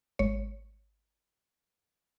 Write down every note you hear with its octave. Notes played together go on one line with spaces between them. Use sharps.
G#1 C#5